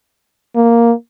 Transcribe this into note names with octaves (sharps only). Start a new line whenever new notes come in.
A#3